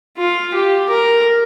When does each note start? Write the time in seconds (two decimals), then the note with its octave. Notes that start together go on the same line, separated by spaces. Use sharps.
0.17 F4
0.54 G4
0.90 A#4